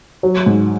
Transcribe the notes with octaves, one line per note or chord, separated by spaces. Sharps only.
F#3
G#2